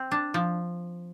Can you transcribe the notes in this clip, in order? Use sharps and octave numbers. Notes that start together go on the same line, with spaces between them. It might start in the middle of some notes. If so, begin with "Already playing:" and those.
Already playing: C4
D4
F3